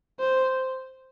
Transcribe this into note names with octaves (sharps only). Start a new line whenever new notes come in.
C5